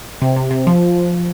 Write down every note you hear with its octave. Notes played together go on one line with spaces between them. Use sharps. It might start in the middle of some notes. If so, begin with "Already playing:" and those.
C3
C3
C3
F3